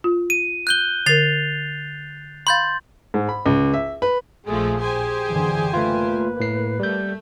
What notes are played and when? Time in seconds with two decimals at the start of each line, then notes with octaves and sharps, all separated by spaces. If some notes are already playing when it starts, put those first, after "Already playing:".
0.04 F4
0.30 D#7
0.67 F#6 G6 G7
1.06 D3 A#4 A6 C7 F7
2.47 F5 B5 C6 G6 A6
3.14 G#2
3.29 B5
3.46 C#2
3.74 E5
4.02 B4
4.46 A#1 F3 G#3 A3 G#4
4.80 G4 G#4 C5 G#5
5.28 F#1 D3 E3
5.74 A3 A#3 F4 B4
6.40 A2 C7
6.80 G3 A3 G6